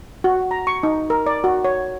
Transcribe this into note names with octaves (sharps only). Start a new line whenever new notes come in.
F#4
A#5
C#6
D#4
A#4
D5
F#4
C#5